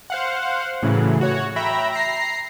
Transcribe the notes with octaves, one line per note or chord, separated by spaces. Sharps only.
C5 F5 F#5
A2 C#3 E3 F#3
F#4 C#5
E5 G5 A#5 B5
A#5 A#6 C7